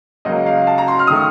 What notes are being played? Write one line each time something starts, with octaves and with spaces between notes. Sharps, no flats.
C#2 C#3 F#3 A#3 D#5
F5
A5
A#5
C6
F6
D#6
D#3 A3 C#6